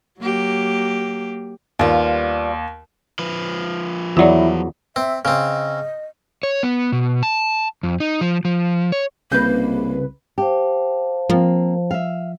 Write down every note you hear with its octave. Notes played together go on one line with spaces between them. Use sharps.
F#3 A#3 G4
D#2 G3 B3 F4
F3 B4
E2 F#3 E4 F4 D5
C4 E5
C#3 C4 D#5
C#5
B3
B2
A5
F2
D#4
F3
F3
C#5
C2 C#3 A#3 B4 D#5 G6
G4 C5 F5 A5
F3 A#3 C4
E5 F5